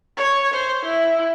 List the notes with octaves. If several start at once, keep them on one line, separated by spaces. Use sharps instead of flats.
C#5
C5
E4